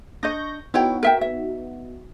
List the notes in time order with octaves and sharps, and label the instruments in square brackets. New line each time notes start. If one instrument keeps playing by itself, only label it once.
[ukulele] D4 D#5 [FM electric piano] C#6 G6 A#6
[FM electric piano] B3 D#4 F#4 [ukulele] E4 C#5 G5
[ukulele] A#4 E5 G5
E5